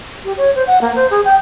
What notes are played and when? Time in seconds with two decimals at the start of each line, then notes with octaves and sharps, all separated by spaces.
0.25 G4
0.37 C#5
0.55 C5
0.67 F#5
0.81 A#3
0.96 C5
1.11 G#4
1.25 G5